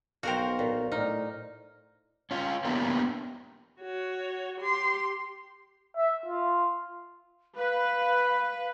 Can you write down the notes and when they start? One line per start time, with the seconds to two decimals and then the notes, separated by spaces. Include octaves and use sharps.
0.23 B1 F#4 A#4 C5 F5 G5
0.59 A#2 B3 A#4
0.92 A2 D#4 C5 D5 F6
2.31 C#4 F4
2.65 A#3 B3 D4 E4 G4
3.81 F#4 C#5
4.60 G4 C6
5.96 E5
6.26 F4
7.57 B4 F5